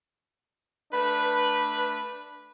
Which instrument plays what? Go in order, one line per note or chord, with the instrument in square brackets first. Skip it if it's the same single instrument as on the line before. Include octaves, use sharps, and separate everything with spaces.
[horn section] A3 D4 B4